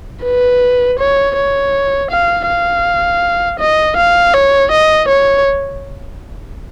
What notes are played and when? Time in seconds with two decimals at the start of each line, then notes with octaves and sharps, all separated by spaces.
0.24 B4
0.99 C#5
1.36 C#5
2.11 F5
2.48 F5
3.60 D#5
3.97 F5
4.34 C#5
4.72 D#5
5.08 C#5